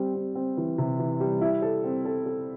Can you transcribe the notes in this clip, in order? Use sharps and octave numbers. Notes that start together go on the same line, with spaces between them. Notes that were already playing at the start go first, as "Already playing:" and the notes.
Already playing: G3 C4
C4
C4
E3
C3
E3
G3
E4
A4
C4
A4
A4